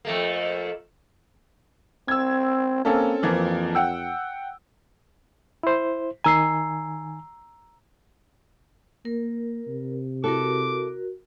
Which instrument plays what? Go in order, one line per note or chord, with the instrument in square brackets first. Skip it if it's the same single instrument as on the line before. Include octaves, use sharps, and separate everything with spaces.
[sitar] F2 A3 A#3
[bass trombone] C4 [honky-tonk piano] E6 G#6
[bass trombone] A#3 [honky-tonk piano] C4 C#4 A4
[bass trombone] F2 [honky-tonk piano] E3 F3 A#3
[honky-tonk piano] F#5 G5 E6
[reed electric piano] E4 C5
[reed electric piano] D#3 G#5 [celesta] A#5 E6 C7
[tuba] A#3 [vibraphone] A#4
[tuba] C3
[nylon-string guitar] E4 A4 [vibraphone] F#4 A#4 [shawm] D6